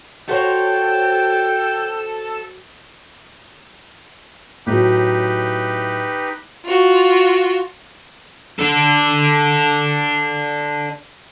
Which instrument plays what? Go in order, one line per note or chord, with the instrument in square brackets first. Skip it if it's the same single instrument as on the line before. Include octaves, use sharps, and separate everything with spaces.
[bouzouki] F#4 C5 C#5 [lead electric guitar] A4 [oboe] G5
[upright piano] A2 F#3 [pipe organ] D#4 G4 B4
[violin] F4 F#4
[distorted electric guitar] D4 A4